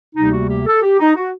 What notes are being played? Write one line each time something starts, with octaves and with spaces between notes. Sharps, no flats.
D2 C3 G3 A#3 D#4
F#4
G4
A4
G4
D#4
F#4